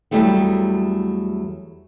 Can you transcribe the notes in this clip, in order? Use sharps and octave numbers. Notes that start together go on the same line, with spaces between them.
E2 F#3 G3 A3 B3